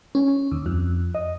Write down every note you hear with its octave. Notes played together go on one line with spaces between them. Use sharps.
C#4
D#2
F2
D#5